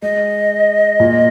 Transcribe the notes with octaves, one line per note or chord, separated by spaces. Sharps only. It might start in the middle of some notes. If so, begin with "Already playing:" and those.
G#3 D#5
A#2